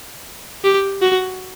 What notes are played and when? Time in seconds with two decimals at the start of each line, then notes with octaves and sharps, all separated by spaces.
0.64 G4
1.02 F#4